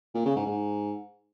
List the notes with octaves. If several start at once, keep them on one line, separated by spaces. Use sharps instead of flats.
A#2
C#3
G#2
G#2